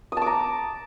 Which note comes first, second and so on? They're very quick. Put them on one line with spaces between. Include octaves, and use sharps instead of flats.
D#6 A5 D6 A#5